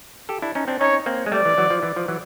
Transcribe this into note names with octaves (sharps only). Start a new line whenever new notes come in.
G4 A4
D4 E4
C#4 D#4
C4 D4
C#4 D#4 C#5
A#3 C4
G#3
G3 A3 D5
E3
E3 F#3
F3
E3
F3
E3 F#3